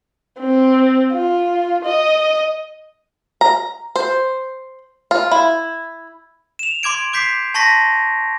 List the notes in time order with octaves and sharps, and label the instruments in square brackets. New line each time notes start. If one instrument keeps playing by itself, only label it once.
[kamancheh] C4
F4
D#5
[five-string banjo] A#5
C5
F4
E4
[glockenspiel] E7 F7
C6 D6 G#6 D7
D6 G6 B6 C7
A5 C6 C#6 A#6 B6